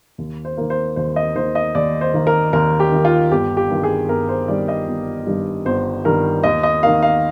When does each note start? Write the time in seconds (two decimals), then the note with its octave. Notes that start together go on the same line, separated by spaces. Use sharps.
0.18 D#2
0.45 C5
0.57 D#3 A#3
0.70 C5
0.96 D#2 C5
1.16 D#5
1.35 D#3 A#3 C5
1.55 D#5
1.75 D#2 D5
2.01 C5
2.14 D#3 A#3
2.27 A#4
2.53 D#2 A#4
2.80 G4
2.92 D#3 A#3
3.05 F4
3.31 G1 G4
3.57 G4
3.70 G2 D#3 G3
3.84 G#4
4.09 G1 A#4
4.29 C5
4.48 G2 D#3 G3 D5
4.68 D#5
4.87 G1
5.27 G2 D#3 G3
5.65 G1 C5
6.05 G2 D#3 G3 A#4
6.44 D#2 D#5
6.63 D#5
6.83 D#3 A#3 F5
7.02 F5